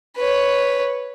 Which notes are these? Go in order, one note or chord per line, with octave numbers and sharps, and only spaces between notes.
B4 C#5